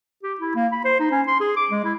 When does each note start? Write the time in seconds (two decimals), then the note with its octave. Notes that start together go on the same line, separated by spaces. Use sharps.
0.23 G4
0.41 E4
0.55 A#3
0.72 B5
0.85 C5
1.00 D#4
1.11 C#4
1.28 C6
1.40 G#4
1.56 D6
1.70 G#3
1.84 E4